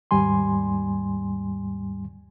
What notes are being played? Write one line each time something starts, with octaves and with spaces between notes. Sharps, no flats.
D#2 G#2 G3 G#5 C6